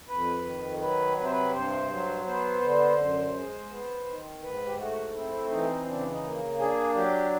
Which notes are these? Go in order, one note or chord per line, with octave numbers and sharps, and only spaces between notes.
F2 B4
D#3
F#3 B4
C3 B4
C5
B4
G2 C5
F#3
B3 C5
D3
F#2
G#3
B3
D#3
G#2 B4
G4
A3 F#4
C4 E4
E3 D#4
C#3 D4
D#4
A#3
D4 G#4
F#3 G4